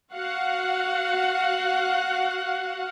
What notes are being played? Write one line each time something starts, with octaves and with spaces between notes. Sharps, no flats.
F#4 F5 F#5